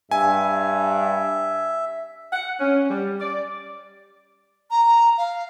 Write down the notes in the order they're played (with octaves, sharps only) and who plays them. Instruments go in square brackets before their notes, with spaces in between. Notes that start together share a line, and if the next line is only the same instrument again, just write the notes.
[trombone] G2 [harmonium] E5 [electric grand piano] G#5
[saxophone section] F#5
C#4
G3
D5
[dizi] A#5
F5